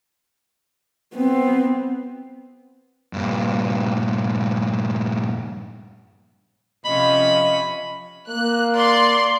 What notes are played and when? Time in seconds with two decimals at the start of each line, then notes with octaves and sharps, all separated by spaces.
1.14 B3 C4
3.13 G2 A#2
6.85 C3 F3 C#4 D#5 B5
8.29 A#3 F#6
8.76 D5 C6